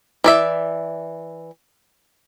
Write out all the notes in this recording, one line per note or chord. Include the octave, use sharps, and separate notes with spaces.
E3 D5 E5